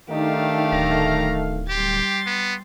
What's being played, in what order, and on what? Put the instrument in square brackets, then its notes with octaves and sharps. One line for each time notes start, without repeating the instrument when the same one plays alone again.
[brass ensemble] D#3 A3 F5 [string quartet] D4 G4 [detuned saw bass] D#4
[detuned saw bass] D1 [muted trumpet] A#5
[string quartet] G3 C6 A6 [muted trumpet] G4
[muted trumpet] B3